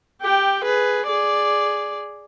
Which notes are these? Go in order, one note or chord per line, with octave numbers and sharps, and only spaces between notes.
G4 G5
G#4 B4
G#4 D5